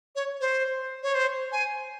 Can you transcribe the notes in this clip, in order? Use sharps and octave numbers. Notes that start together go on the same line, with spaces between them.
C#5
C5
C#5
C5
G#5